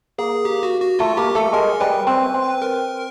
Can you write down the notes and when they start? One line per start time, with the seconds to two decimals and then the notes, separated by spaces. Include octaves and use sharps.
0.18 A#3 G#4
0.45 G4
0.63 F#4
0.81 F#4
0.99 A3 F4
1.17 A#3 G4
1.35 A3 A4
1.53 G#3 A#4
1.80 G3 B4
2.07 C4 B4
2.34 C4
2.62 A#4